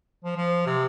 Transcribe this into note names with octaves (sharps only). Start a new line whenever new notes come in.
F3
F3
C3